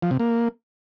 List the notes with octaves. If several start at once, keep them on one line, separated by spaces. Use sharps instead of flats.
F3
C3
A#3